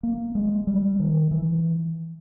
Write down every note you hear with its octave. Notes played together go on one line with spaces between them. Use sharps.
A#3
G#3
G3
D#3
E3